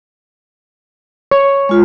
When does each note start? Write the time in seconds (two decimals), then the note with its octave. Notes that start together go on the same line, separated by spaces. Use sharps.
1.31 C#5
1.69 G#3 F4